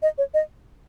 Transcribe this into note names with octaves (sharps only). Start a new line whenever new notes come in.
D#5
C#5
D#5